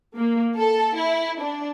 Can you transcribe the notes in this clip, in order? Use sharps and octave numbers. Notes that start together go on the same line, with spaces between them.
A#3
A4
E4
D4